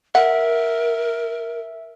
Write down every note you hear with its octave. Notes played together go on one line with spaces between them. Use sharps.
A#4 E5 F#5